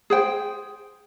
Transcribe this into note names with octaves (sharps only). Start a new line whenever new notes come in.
G#4 C5 G5